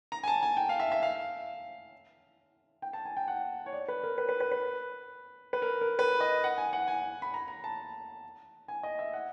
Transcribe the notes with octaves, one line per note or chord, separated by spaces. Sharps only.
A#5
G#5
A5
G#5
G5
F5
E5
E5
F5
G5
A5
G#5
G5
F#5
C#5
D5
B4
A#4
B4
B4
B4
B4
B4
A#4
A#4
B4
D#5
F#5
G#5
F#5
G#5
B5
A#5
A#5
A5
G#5
D#5
E5
F#5